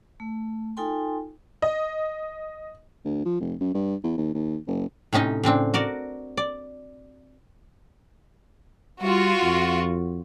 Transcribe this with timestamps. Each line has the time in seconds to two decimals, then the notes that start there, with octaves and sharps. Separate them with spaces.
0.20 A3
0.77 D#4 F4 A4 G5 G#5 C6
1.62 D#5
3.05 D2
3.25 F3
3.40 F1
3.60 F#2
3.74 G2
4.04 E2
4.18 D#2
4.34 D#2
4.67 F#1
5.13 A2 C3 C#4 D#4 D#5
5.43 A2 C#3 C4 D4
5.74 F#4 A#4 D5
6.37 D5
9.02 G3 F4 F#4
9.43 F2